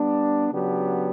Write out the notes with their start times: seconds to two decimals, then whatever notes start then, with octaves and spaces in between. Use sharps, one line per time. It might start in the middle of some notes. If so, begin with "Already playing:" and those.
Already playing: G3 B3 D4
0.52 C#3 F#3 B3 D4 G4